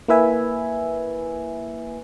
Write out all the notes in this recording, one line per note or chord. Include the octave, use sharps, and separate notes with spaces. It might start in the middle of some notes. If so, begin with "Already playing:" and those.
A#3 E4 B4 E5 G#5